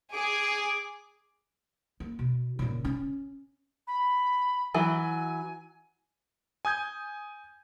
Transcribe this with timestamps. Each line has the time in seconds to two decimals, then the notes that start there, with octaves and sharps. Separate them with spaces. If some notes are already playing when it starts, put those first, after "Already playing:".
0.13 G#4 D6
2.00 A#3
2.19 B2
2.59 A#2 C#3
2.84 C#4
3.87 B5
4.74 E3 F#3 G#5
6.65 G#5 D#6 G6 G#6